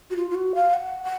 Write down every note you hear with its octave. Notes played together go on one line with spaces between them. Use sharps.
F#4
F4
F4
F#4
F5
F#5
F#5